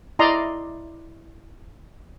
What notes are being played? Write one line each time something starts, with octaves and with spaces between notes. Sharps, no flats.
E4 D5 D#5 A#5 C6